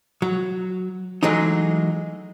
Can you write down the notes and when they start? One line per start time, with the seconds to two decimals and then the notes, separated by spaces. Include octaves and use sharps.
0.22 F#3
1.23 E3 F#3 G#3 A3 D#4